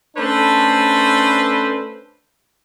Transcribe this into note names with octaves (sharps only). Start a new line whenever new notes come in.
A3 C#4 D4 A4 B4 C5